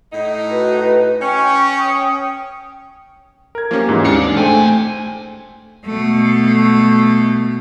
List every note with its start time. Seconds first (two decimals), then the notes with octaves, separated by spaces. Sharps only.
0.12 A2 D#4
0.51 F#4 B4
0.84 D#5
1.22 C#4 G5 C#6
1.78 D#6
3.55 A#4 G#6
3.71 F3 A#3 C#4 F4 G4
3.89 G#2 E3
4.05 D#2 G#3 C4 D4 F5 C#7
4.37 A2 A3 C5 G5 G#5
5.86 B2 A3